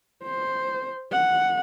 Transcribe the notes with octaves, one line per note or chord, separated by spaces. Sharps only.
C5
F#5